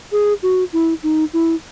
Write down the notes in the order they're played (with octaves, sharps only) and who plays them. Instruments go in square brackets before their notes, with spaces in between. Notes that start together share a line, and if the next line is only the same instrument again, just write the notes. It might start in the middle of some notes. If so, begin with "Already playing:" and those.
[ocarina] G#4
F#4
E4
D#4
E4